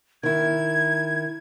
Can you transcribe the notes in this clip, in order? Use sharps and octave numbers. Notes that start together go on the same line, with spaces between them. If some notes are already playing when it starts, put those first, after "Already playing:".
D#3 E4 G#6